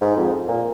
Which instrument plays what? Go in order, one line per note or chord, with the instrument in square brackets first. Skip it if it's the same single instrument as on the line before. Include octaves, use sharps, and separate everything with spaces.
[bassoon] G#2
F2
A#2